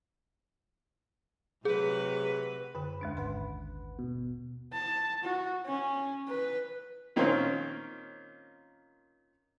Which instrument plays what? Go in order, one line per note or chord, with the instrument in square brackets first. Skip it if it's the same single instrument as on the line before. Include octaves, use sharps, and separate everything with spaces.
[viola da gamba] C3 F#3 B4 [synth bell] G#4
[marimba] F#2 D3 [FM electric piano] B4
[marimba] D#2 G#3 D4
[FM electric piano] G#1 B4 F#5 [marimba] C6
[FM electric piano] B2
[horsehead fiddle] A5
F#4
C#4
B4
[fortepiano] A#2 D#3 A#3 C4 C#4 F4